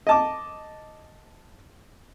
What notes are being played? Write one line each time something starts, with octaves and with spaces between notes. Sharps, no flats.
D#5 A5 D6